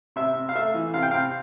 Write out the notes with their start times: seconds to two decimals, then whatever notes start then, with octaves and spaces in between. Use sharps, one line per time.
0.16 C3 E5
0.35 C3
0.49 F5
0.55 A3 E5
0.74 E3
0.94 C3 F5
1.03 G5
1.11 C3 F5